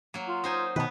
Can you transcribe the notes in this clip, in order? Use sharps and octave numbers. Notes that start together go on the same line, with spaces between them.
F#3 A#3
F4
D#4 C5 G#5
B2 D#3 B3 B4